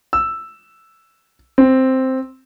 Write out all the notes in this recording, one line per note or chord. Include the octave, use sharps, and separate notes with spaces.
E6
C4